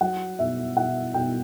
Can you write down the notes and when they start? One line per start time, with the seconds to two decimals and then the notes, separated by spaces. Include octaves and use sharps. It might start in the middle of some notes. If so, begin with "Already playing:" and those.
0.01 F#3 F#5
0.39 B2 E5
0.77 B2 F#5
1.14 B2 G5